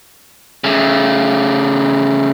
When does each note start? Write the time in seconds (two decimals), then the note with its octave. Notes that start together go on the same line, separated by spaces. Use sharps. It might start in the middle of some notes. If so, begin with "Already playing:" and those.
0.64 C#3 A3